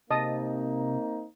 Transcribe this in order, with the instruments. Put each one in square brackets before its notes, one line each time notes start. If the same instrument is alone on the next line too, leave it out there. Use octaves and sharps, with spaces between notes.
[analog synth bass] C3 [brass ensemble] A#3 C4 D#4 [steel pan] D#5 A5 D#6